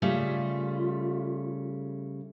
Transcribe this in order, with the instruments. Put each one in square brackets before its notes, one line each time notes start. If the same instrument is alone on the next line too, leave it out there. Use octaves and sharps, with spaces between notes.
[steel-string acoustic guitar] C#3 G3 A3 [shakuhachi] F4